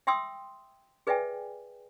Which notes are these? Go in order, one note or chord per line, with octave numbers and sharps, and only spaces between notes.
E5 G5 C6 D#6 E6
G#4 B4 D5 E5 G5 G#5